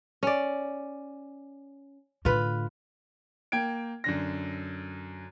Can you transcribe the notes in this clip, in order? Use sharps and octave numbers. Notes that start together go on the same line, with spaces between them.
C#4 D5
A2 D3 F4 B4
A#3 G5 G#6 D7
F#2 D3 A#6